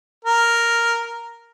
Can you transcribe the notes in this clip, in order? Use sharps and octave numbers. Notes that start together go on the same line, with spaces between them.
A#4